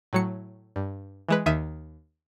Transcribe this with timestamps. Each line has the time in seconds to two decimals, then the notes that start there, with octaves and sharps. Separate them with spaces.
0.13 A2 F#3 C#7
0.76 G2
1.29 E3 G#3 B4
1.46 D#2 D#3 E5 D#7